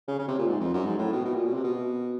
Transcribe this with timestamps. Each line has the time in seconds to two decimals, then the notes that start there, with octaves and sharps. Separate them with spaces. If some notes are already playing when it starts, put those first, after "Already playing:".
0.08 C#3
0.19 C#3
0.28 C3
0.38 A#2
0.47 G#2
0.60 F2
0.74 F#2
0.86 G#2
0.99 A2
1.13 B2
1.25 B2
1.35 A#2
1.45 B2
1.54 C3
1.64 B2